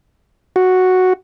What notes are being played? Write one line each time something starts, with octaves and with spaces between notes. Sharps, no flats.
F#4